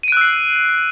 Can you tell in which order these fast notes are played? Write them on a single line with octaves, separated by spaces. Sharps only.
D#7 D7 F#6 E6 C7